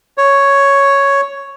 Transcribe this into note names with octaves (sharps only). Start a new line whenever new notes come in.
C#5